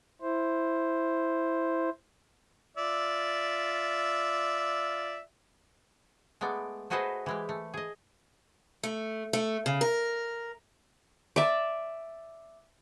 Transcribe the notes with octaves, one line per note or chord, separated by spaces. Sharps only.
E4 C5
F4 D5 E5
G#3 A3 B3 D5
A3 F#4 G#4 B4 C5 D#5
E3 G#3 G4
A3
G#4 D#5
A3
A3
C#3
A#4
D5 E5